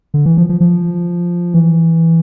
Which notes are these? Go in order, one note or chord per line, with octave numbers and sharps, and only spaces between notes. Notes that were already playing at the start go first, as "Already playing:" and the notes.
D3
E3
F3
F3
F3
E3